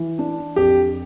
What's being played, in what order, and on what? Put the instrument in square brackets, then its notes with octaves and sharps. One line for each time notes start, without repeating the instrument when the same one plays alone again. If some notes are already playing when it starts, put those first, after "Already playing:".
Already playing: [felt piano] E3
D4
[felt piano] F2 [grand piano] G4